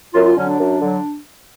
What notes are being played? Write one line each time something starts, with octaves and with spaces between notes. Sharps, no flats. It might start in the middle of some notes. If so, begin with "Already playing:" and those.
F#2 F4
F4
D3 F#3 C#4
D4
F#2
D3 F#3